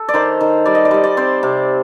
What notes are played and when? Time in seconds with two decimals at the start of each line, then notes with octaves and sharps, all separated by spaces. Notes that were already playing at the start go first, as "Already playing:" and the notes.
Already playing: A4
0.09 D5
0.14 D#3 C5
0.41 D#3
0.65 G3 D5
0.75 D#5
0.85 D5
0.91 G3 D#5
1.04 D5
1.17 C4 C5
1.43 C3